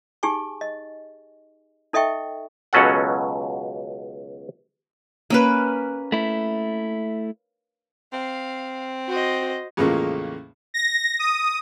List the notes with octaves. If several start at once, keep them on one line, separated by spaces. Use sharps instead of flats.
D#4 G4 G#4 G#5 C#6
D#5
D#4 A4 D#5 E5 G5 C#6
C#2 B2 F#3 C#4 A4 F#5
A#3 C#4 B4
A3 E4
C4 F5
F#4 C5 D#5
E2 A2 C#3 F3 G#3 A#3
A#6
D#6